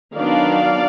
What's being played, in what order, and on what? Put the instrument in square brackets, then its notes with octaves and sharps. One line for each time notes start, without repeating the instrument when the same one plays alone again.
[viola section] D#3 F#3 B3 D4 D5 F5